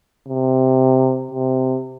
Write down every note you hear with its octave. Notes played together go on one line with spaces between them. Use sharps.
C3
C3